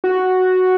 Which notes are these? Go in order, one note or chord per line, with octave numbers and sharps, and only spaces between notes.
F#4